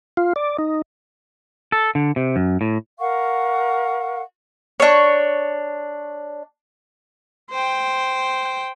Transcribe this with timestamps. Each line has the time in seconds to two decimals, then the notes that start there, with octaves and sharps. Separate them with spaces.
0.17 F4
0.36 D5
0.59 D#4
1.72 A4
1.95 D3
2.16 C3
2.36 F#2
2.61 A2
2.99 A#4 F5 F#5 C#6
4.80 D4 C#5
7.51 C5 G5